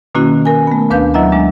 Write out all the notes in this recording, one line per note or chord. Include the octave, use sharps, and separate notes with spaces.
B2 D#3 A#3 C#4 E4 F#4
A#4 G#5
A3 B3
D2 D4 B4 F5 G6
F#3 E4 D#5 E5 A#5
G#3 D4